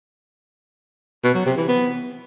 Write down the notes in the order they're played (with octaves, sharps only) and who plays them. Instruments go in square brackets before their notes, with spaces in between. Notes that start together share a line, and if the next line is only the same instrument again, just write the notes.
[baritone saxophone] B2
F#3
C3
E3
B3